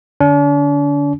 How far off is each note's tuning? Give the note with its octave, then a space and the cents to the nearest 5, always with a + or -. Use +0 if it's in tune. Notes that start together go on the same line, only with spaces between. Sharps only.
D3 +0 D4 -45